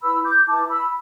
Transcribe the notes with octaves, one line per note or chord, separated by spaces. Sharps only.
E4 B4 B5 E6
D6 G6
E4 B4 A5 D6
B5 E6